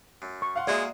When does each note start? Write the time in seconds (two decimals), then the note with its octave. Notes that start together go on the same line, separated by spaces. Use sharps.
0.22 F#2
0.42 C#6
0.56 F5 F#5 C6
0.67 G#3 A#3 F#4 G#4 D5 E5